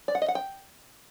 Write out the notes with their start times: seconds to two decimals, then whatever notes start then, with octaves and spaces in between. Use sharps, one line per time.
0.08 D5
0.15 F#5
0.22 D#5
0.28 F#5
0.35 G5